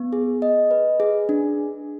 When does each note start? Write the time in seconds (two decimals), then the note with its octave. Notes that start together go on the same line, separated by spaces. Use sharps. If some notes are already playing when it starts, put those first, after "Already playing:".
Already playing: B3
0.13 G#4
0.42 D#5
0.71 B4
1.00 G#4
1.29 D4